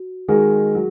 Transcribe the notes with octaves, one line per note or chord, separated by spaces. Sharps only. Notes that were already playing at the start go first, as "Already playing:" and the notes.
Already playing: F#4
D#3 G#3 D#4 F#4 G#4 A#4
F#3